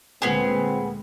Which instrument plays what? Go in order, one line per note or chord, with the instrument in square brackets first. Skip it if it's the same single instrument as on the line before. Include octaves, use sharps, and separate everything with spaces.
[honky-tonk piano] D2 A#2 G#5 [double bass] G#3 [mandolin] B3 G#4 [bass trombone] C4